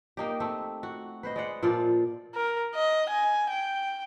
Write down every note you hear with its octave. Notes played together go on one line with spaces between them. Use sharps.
A#3 D#4 G4
A3 C4
F#4
B4 C5 D#5
G#3 D5 F#5
A#2 F3 F4 D5
A#4
D#5
G#5
G5